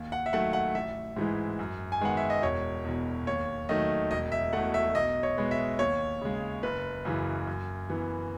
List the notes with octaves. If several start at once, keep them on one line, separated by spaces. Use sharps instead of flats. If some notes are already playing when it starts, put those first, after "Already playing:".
Already playing: D#2
F#5
E5
D#3 F#3 A3 F#5
F#5
A1 E5
G#2 E3 G#3
F#2
G#5
D#3 G#3 B3 F#5
E5
D#5
E1 C#5
E2 B2
D#2 C#5
D#3 F#3 A3 D#5
E1 D#5
E5
E2 B2 A3 F#5
E5
B1 D#5
C#5
B2 G#3 B3
E5
D#2 C#5
C#3 G#3
F#1 B4
F#2 C#3 E3
F#2
E3 B3